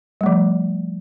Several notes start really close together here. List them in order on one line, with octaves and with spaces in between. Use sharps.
G3 A3 F3